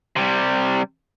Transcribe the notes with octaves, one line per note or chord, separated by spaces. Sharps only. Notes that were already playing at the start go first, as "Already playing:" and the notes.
C3 G3